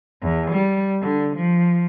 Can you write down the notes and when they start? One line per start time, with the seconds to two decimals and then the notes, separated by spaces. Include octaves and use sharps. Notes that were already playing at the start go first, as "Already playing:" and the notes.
0.22 E2
0.51 G3
1.02 D3
1.37 F3